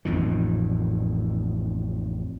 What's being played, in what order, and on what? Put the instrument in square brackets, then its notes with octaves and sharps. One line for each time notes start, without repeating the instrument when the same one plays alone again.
[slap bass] A1 F2 A#2 D#3